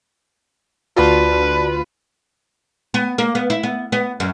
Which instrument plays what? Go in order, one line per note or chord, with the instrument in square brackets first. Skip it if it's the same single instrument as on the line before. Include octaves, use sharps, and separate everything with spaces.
[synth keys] D2 F4 [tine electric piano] F#4 D5 A5 [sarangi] B4
[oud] B3
A#3
B3
E4
B3
B3
F#2